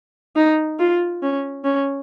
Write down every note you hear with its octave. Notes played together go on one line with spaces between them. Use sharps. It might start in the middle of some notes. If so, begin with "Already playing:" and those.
D#4
F4
C#4
C#4